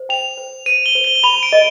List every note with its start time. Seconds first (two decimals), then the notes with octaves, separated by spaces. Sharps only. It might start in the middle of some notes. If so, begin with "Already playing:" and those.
Already playing: C5
0.09 G5 F7
0.37 C5
0.66 C5 D#7
0.86 G7
0.95 C5
1.04 G7
1.16 G7
1.23 B5 F7
1.43 D7
1.53 D#5